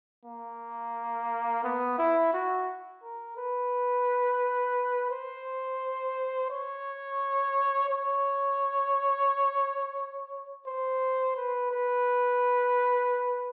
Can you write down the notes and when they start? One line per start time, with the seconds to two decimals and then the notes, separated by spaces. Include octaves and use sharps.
0.25 A#3
1.64 B3
1.98 E4
2.34 F#4
3.03 A#4
3.37 B4
5.11 C5
6.50 C#5
7.89 C#5
10.67 C5
11.36 B4
11.71 B4